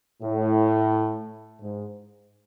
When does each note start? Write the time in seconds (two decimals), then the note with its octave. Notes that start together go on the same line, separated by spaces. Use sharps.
0.22 A2
1.62 G#2